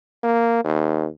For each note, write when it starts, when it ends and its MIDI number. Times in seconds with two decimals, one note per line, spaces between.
0.23 0.61 58
0.64 1.07 39